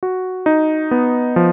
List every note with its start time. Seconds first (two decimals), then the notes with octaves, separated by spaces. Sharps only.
0.03 F#4
0.46 D#4
0.91 B3
1.36 F3